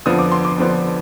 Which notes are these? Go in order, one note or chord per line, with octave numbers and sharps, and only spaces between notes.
F2 D3 F3 B3 D4 D#6
D6
C6
D6
F2 D3 F3 B3 D4